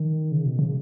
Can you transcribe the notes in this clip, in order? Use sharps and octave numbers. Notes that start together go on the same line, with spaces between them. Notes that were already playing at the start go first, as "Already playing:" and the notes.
Already playing: D#3
C#3
B2
C#3